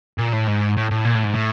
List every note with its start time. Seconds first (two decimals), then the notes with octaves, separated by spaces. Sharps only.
0.18 A#2
0.33 A2
0.48 G#2
0.77 A2
0.91 A2
1.05 A#2
1.15 A2
1.24 G#2
1.35 A2